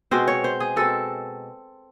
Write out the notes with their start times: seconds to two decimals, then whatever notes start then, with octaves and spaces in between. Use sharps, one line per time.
0.11 B2 G#3 C4 C5
0.28 C#5
0.44 C5
0.60 G#4
0.76 B2 G#3 C4 A4